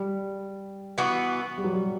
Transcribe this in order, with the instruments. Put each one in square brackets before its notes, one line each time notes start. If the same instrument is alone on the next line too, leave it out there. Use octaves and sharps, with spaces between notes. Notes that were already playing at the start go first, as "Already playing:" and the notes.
Already playing: [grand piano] G3
[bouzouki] E3 B3 F#4
[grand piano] G3
F#3
G3